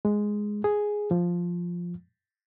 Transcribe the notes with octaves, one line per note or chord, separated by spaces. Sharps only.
G#3
G#4
F3